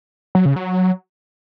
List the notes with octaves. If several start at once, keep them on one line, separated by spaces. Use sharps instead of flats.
F#3
C#3
F#3